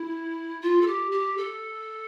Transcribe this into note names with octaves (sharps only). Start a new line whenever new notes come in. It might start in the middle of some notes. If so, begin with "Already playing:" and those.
Already playing: E4
F4
A4
G4
G4
A4